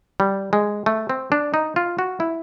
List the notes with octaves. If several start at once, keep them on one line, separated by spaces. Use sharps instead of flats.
G3
G#3
A3
C4
D4
D#4
F4
F#4
E4